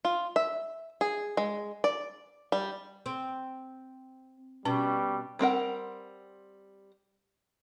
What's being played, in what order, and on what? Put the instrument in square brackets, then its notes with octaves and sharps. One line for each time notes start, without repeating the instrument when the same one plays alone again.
[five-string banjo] F4
E5
G#4
G#3
D5
G3
[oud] C4
[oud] B2 [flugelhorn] G3 [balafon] C#4
[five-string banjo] G3 C4 A#4 F#5